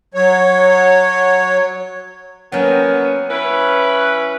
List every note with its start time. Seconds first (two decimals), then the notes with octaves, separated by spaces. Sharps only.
0.14 F#3 C#5
2.52 F#3 A#3 B3 C#4 G5
3.30 C#4 E4 B4